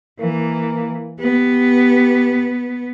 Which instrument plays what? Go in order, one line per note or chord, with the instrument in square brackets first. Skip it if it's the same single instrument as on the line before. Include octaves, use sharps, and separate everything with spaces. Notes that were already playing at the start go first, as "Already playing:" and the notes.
[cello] E3 [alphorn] A#3
[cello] B3 [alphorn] G4